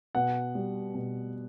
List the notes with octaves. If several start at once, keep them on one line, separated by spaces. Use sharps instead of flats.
B2 F#5
G3
B2